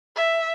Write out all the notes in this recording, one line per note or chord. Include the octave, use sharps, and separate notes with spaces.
E5